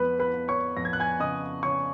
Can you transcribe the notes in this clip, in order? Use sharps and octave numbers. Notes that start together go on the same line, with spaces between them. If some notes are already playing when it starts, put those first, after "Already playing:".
Already playing: F2 G#3 B3 B4 B5
B4 B5
B3
C#5 C#6
F2 A#6
G#6
F#6
G#5 G#6
C#3 D#5 D#6
C#3 C#5 C#6